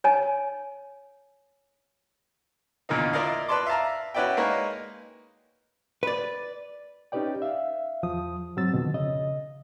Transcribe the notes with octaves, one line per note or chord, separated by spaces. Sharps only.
C#5 G#5 A5
E2 A#2 D3 D#3 D#4
E4 F4 A#4 D5 D#5 F5
B4 D5 A5 C6 D6
E5 F5 A5 A#5
C#4 F#4 B4 D5 E5 G5
G#3 A#3 D#4 A#4 B4 C#5
B4 D5
C#4 D#4 G4 B4 D5 G5
E5 F5
E2 F3 D#6
G#2 F#3 C4 E6 A6
F2 B2 D3 D#3 F3
C#3 D#5